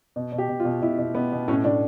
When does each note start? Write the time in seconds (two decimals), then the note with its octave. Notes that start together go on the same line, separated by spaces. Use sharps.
0.16 B2
0.32 B2
0.38 G4
0.49 B2
0.60 F4
0.65 B2
0.82 B2 E4
0.98 B2
1.15 B2 B3
1.32 B2
1.48 A2 C#4
1.64 A2 D4